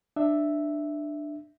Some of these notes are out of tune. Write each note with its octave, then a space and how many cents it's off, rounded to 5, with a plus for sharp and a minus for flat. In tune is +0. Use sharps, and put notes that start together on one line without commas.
D4 +15 E5 +0